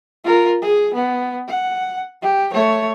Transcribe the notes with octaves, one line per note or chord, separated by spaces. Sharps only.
F4 A#4
G#4
B3
F#5
G4
A3 C#5